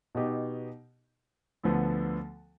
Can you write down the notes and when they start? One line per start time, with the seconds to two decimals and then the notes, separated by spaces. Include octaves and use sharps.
0.15 B2 B3 D#4 G4
1.63 D2 D3 F3 B3